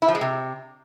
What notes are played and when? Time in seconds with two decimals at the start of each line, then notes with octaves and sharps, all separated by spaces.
0.02 E4
0.08 F3
0.15 G#3
0.21 C3